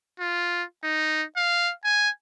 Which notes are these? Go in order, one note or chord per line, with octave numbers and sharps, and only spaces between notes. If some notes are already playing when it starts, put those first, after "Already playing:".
F4
D#4
F5
G#5